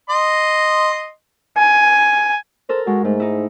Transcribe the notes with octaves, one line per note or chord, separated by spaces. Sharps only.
D#5 C6
G#5
A4 A#4 C5
G#3 F#4
G#2 A3
D#4 E4